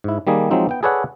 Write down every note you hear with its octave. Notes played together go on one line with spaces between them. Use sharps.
G#2 E4
D#3 G3 A#3 G#4
F3 F#3 G#3 C4 D#4
B3 G5
G#4 A4 B4 C#5 D5 F#5